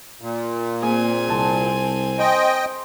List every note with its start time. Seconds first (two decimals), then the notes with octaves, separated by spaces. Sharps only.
0.21 A#2
0.83 A#3 C4 G#4 G#5
1.28 C2 C5 A5
2.19 C5 D#5 G5